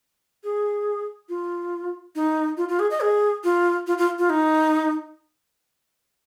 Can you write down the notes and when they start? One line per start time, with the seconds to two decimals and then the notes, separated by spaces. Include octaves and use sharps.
0.43 G#4
1.29 F4
2.15 D#4
2.57 F4
2.68 F4
2.79 G#4
2.91 D#5
3.01 G#4
3.44 F4
3.87 F4
3.98 F4
4.19 F4
4.30 D#4